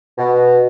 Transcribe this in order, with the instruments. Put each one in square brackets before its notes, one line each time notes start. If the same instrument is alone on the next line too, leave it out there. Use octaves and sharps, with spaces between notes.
[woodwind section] B2